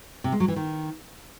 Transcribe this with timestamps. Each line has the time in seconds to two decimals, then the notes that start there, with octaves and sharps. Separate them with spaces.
0.24 C3
0.32 G#3
0.40 F#3
0.48 E3
0.56 D#3